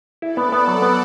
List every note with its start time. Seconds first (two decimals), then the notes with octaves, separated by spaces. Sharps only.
0.22 E4 A4 D5
0.37 B3
0.52 B3 D5 F#5
0.68 F#3
0.82 B3